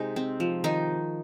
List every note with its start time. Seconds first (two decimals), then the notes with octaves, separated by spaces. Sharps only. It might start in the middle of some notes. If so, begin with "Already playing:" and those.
Already playing: C3 G#3 D#4
0.16 C4
0.40 F3
0.64 D#3 D#4